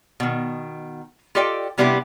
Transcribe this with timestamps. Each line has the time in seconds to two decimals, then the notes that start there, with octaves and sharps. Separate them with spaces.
0.20 B2 D#3
1.35 F4 G4 A4 D5 D#5 G5
1.78 C3 G3 B3 D4 E4 G4